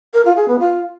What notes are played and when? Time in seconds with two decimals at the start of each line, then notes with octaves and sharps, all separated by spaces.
0.14 A#4
0.25 F4
0.37 G#4
0.48 B3
0.59 F4